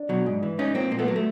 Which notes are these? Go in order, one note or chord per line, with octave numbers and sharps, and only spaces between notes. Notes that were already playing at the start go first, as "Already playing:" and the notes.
Already playing: D4
B2 F#3
G#2
E3
G#2 C#4 D#4
F3 A#3 C4
A#2 A#3
A3 B3
F#3 A#3
A3